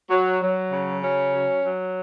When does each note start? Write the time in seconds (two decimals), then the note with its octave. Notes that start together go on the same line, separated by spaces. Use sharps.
0.10 F#3
0.42 F#3
0.72 C#3
1.03 F#3 C#4
1.35 F#3
1.65 F#3